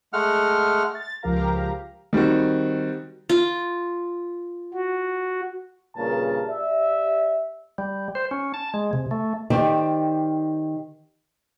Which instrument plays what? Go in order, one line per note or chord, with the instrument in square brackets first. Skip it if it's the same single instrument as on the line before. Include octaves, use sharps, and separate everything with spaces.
[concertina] G#3 A3 F#5 F6
[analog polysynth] A6
C#2 F3 G4 A#4 F5 A#5
[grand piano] D#3 G3 C4 F#4
[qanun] F4
[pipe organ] F#4
[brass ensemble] G2 A#2 C#3 A#4 A5
G4 D5 E5
[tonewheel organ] G3
C5
C#4
A5
G#3
C3
A3
[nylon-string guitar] D#3 G4 C5 D5